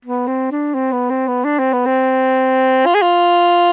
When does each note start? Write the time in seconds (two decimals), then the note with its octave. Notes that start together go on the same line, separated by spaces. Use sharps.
0.05 B3
0.27 C4
0.51 D4
0.74 C4
0.92 B3
1.10 C4
1.28 B3
1.45 D4
1.59 C4
1.73 B3
1.86 C4
2.86 F4
2.95 G#4
3.02 F4